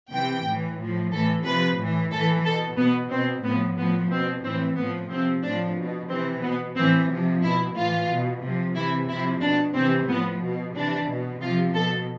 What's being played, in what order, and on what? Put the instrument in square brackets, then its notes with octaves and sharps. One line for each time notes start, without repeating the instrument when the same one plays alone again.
[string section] C3 E3 G5
A2 E3
A2 F3
A2 E3 A4
C3 F3 B4
A2 E3
A2 E3 A4
B2 A4
B2 B3
B2 C4
A2 F3 B3
A2 F3 B3
B2 C4
A2 E3 C4
A2 F3 B3
C3 F3 C4
A2 F3 D4
B2
C3 E3 C4
B2 B3
A2 E3 C4
C3 F3
B2 E4
A2 E3 F4
B2
C3 F3
C3 E3 E4
C3 F3 E4
B2 D4
C3 E3 C4
A2 F3 B3
B2
C3 E3 D4
B2
C3 F3 F4
B2 A4